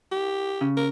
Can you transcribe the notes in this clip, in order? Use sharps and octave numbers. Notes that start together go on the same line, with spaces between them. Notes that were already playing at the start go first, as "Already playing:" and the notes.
G4
C#3
A#4